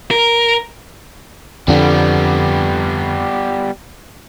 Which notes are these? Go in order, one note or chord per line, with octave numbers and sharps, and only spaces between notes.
A#4
F2 D3 G3 B3